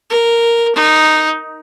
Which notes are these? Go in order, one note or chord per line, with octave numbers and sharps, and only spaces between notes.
A#4
D#4